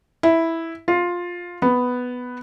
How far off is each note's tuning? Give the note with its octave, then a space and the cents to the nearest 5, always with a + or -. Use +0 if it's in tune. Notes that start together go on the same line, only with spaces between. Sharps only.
E4 -5
F4 +10
B3 +5